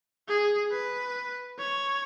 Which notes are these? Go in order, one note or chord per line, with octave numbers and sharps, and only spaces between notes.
G#4
B4
C#5